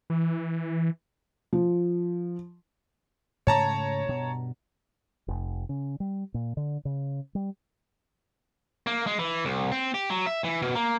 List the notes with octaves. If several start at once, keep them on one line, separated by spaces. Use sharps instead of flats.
E3
F3
G#2 C#3 A3 C#5 A5 A#5
G2 B2
F1
C#3
G3
A#2
D3
C#3
G3
A#3
G#3
E3
C2
C4
G4
F#3
E5
E3
B2
A#3